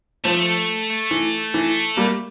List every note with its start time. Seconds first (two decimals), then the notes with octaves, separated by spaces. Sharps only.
0.25 F3 A3
1.11 E3
1.54 E3
1.97 G3 A#3